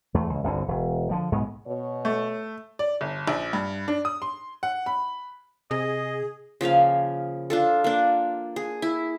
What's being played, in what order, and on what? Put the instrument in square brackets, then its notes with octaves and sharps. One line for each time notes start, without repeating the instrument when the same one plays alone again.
[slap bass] E2 A3
C#2
G1 C2 D3
E1
D3 F3 G3
B1 G#2 G#3 B3
[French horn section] B2 C#5
[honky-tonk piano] A3
[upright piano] D5
G1
A#1
G2
D4
D#6
C6
F#5
B5
[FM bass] C3 [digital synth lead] G#4 [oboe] D#5
[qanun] C#3 F3 A#3 F5
D4 F4 A4
A#3 D4
G#4
E4